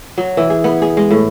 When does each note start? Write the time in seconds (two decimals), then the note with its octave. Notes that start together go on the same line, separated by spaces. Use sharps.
0.18 F#3
0.37 E3
0.50 G#4
0.64 B3
0.82 G#4
0.97 G#3
1.11 A2